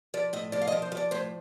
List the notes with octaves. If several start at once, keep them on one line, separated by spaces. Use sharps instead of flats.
F3 D5
A2 D#5
F3 D5
F5
D#5
F3
C5
F3
D5
A2 C5